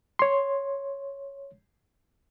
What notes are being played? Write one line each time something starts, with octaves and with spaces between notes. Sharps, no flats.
C#5 C6